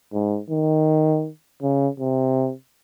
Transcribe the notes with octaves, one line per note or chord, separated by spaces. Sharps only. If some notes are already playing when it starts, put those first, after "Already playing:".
G#2
D#3
C#3
C3